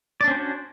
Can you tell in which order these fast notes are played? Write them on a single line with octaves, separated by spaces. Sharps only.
D5 D4 C#4 C5 F#4